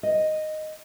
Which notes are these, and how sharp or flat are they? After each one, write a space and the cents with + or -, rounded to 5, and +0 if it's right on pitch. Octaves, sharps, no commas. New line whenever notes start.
D#5 -5